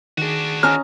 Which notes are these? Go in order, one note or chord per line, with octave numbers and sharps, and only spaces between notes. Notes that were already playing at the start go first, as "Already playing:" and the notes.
D#3 D4 F#4 G#4
C#4 D#5 A#5 F6